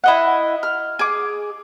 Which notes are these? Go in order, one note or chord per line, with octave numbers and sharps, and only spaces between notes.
E4 D#5 F#5
F6
G#4 D6